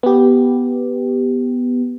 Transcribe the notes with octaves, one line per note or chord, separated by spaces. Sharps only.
B3 G4